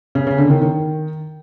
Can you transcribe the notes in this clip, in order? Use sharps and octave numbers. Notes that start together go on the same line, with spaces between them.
C#3
C#3
D3
D#3
D#3